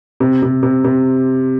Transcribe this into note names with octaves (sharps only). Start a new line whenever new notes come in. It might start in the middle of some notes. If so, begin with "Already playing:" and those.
C3
C3
C3
C3